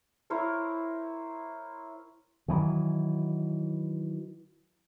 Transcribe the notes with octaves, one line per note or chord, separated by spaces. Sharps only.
E4 A#4 C5 C#5
D#3 E3 F#3